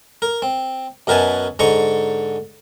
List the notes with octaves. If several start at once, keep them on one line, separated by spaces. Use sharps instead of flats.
A#4
C4
F#2 B2 A#4 B4 G#5 A5
G#2 D3 A#5 C6 C#6